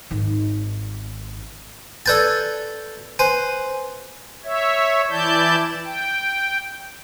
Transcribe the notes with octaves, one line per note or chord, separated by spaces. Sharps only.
G#1 D#3
A4 B4 D5 G#5 G6 A6
B4 C5 G#5
C#5 E5
E3 E4 D5 A5 G6
G5